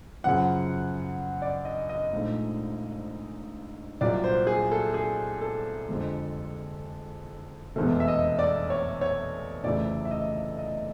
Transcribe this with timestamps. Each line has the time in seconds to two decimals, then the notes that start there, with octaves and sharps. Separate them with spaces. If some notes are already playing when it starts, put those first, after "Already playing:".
0.24 F#2 C#3 F3 F#5
1.42 D5
1.65 D#5
1.89 D#5
2.12 A#1 G#2 F3 A3
4.01 C2 A#2 F#3 D5
4.24 C5
4.47 G#4
4.72 A4
4.94 G#4
5.41 A4
5.88 F2 D3 F3 G#3
7.76 F1 E2 B2 G#3 A4
8.00 E5
8.08 D#5
8.39 D5
8.70 C#5
9.01 C#5
9.64 F1 F2 C#3 E3 A3 D5
10.05 E5
10.11 D#5
10.59 D#5